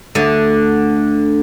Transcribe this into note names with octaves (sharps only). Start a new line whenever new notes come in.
D2 D3